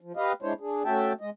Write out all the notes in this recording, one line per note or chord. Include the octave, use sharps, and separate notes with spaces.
F3
G4 B4 D#5 F5
G#3 D4 E4 C5 C#5
D4 G#4
A3 C#4 F#4 E5 G5 A5
G#3 D#5